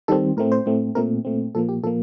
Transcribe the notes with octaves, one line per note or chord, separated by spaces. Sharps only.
D#3 G3 C4 A4
A2 A3 C4 A#4
C5
A2 A3 C4
A#2 A3 C4 A#4
A#2 A3 C4
A#2 F3 A#3 A4
G4
A#2 F3 A#3 A4